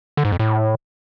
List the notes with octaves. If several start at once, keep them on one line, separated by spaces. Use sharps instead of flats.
D3
G#2
F2
A2